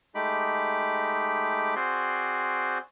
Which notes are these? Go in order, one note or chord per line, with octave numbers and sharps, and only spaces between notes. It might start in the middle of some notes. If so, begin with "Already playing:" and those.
G#3 A3 D#4 G4 B5 D6
C4 F#4 G#4 C5 D5 C6